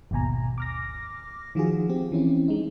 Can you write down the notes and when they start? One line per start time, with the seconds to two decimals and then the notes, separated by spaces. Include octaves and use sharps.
0.11 G#1 D#2 B2 G#5 A#5
0.58 D6 F6 A#6
1.55 D#3 F3 F4 F#4 G#4
1.89 C4 G4
2.12 E3 C4 C#4 E4
2.48 G#3 D#4